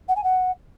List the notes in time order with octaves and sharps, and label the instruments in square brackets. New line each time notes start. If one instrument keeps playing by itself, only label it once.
[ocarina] F#5
G#5
F#5